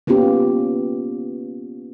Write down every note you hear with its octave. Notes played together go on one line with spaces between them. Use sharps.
A#3 B3 C#4 F4 G4